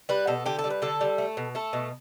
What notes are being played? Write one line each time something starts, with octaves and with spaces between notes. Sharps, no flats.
G3 B4
B2 A4
D3 G4
A4
G3
B4
D3 A4
G3
A3
B2
A3 A4
B2